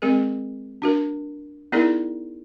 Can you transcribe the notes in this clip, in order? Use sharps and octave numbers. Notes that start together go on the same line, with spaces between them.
G#3 C4 G#4 A#4
D4 F#4 A#4
B3 D#4 E4 G#4 A#4 D5